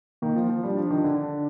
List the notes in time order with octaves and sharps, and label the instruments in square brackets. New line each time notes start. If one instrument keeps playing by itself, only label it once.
[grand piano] D#3 [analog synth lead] A#3
[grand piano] F3
F3
[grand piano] G3 [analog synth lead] D4
[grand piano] F3
D#3
[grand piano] D3 [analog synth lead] D4